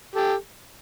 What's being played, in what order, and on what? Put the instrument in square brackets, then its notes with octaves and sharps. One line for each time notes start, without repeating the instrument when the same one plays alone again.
[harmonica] G4 A4